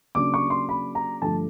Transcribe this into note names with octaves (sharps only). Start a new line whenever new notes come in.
C#3 F#3 A#3 D4 D6
C#6
C6
B5
A#5
G2 D3 F3 A3 A5